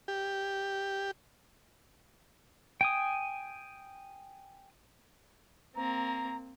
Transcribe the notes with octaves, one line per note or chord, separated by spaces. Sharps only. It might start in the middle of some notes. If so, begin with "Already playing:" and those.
G4
G5 G#5 D#6
A#3 C4 A#5